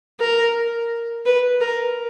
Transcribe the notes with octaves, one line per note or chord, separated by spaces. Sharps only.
A#4
B4
A#4